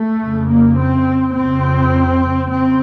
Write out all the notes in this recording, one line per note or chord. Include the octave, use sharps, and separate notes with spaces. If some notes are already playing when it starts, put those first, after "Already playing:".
Already playing: A3
F2 C#3
A#3
C4
F2 C#3 C4
C#3 C4